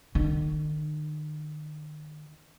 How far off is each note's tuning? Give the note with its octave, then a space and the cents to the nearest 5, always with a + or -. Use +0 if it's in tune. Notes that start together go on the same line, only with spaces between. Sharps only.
D#3 -40 C#4 +35